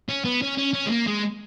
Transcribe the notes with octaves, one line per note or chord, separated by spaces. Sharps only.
C#4
B3
C#4
C#4
C#4
G#3
A#3
G#3